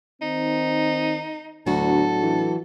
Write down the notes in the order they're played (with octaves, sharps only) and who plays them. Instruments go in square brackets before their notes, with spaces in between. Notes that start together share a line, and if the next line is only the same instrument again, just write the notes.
[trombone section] D#3 C4 [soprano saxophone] D#4
[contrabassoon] D2 [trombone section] A2 B3 D4 [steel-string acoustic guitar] F#3 F#4 [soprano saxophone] A4
[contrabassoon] E3